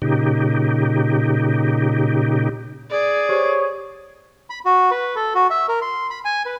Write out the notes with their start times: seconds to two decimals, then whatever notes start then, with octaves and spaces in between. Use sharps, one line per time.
0.02 A#2 C#3 D#4 G4
2.91 G#4 D5
3.29 G4 C5 C#5
4.50 B5
4.65 F#4
4.91 B4
5.16 A4
5.35 F#4
5.50 E5
5.68 A#4
5.82 C6
6.10 B5
6.25 G#5
6.45 B4